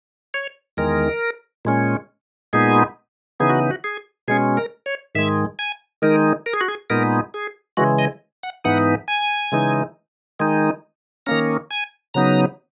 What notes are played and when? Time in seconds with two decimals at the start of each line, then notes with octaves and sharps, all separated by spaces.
0.34 C#5
0.77 E2 D#3 G#3 A#4
1.65 A#2 G#3 C#4
2.53 A#2 G#3 B3 D#4 G#4
3.40 C#3 E3 B3 D#4 G#4
3.50 F#4
3.71 F#4
3.84 G#4
4.28 B2 G#3 C#4 G#4
4.57 A#4
4.86 C#5
5.15 G#2 D#3 G#3 E5
5.59 G#5
6.02 D#3 G#3 D#4 A#4
6.46 A#4
6.53 G#4
6.61 F#4
6.68 G#4
6.90 A#2 G#3 B3 D#4 A#4
7.34 G#4
7.77 C#3 E3 G#3 F#4
7.99 D#5
8.43 F#5
8.64 G#2 E3 B3 D#4 F#5
9.08 G#5
9.52 C#3 E3 G#3 D#4
10.40 D#3 G#3 D#4
11.26 D#3 A#3 C#4 A#5
11.71 G#5
12.14 C#3 F#3 B3 D#4 A#5